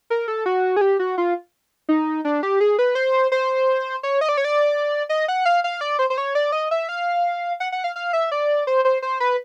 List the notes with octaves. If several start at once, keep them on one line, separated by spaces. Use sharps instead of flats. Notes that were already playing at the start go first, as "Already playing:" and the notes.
A#4
A4
F#4
G#4
G4
F#4
F4
D#4
D4
G4
G#4
B4
C5
C5
C#5
D#5
D5
C#5
D5
D#5
F#5
F5
F5
D5
C5
C5
C#5
D5
D#5
E5
F5
F#5
F#5
F5
F5
E5
D5
C5
C5
C5
B4